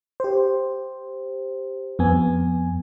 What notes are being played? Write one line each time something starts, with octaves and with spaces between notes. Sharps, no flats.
G4 C5
F2 B3 G#5